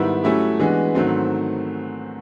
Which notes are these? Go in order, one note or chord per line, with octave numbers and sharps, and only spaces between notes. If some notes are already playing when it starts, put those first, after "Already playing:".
Already playing: G#2 D#3 G3 B3 E4
F#3 A3 C#4 E4 G4
E3 G#3 B3 D4 F#4
G#2 D#3 F#3 A3 C4